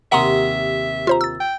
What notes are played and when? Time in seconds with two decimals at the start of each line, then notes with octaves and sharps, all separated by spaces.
0.12 D#2 C3 E5 F#5 A#5 C6 D#6
1.07 F4 C5 A#5
1.21 E6 A6
1.40 G5